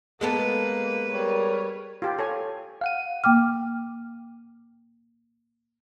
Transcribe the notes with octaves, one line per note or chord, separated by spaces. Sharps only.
G#3 A#3 B3 A4 B4
G3 A#4 C#5
F4 G4
A4 C#5 G#5
F5 F#5 D#7
A#3 G5 D6 F6